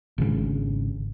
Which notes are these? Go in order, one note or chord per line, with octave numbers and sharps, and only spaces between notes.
G#1 C#3